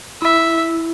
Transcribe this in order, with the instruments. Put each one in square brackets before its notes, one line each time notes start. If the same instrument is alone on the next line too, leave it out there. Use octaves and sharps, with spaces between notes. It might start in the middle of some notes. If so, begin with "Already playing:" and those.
[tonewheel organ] E4 [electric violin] E5